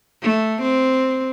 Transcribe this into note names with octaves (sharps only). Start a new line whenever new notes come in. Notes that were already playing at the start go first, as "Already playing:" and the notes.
A3
C4